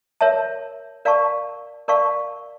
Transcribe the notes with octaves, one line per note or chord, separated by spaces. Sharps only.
A#4 C#5 E5 A5
A#4 D5 F5 A5 C#6
A#4 D5 F5 A5 C#6